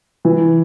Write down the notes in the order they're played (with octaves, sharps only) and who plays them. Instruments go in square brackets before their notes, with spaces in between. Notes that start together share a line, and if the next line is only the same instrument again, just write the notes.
[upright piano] E3